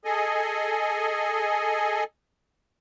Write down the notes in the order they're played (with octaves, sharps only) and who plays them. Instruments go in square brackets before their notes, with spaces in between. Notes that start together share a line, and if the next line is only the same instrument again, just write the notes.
[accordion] G#4 A4 D#5 G#5